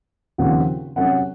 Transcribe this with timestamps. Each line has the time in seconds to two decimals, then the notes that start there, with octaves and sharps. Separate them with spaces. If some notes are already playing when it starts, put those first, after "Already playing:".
0.38 D#2 C#3 F3 C4 F#5
0.96 C3 F#3 C#4 F#5